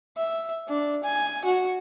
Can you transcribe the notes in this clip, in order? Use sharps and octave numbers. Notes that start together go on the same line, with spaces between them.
E5
D4
G#5
F#4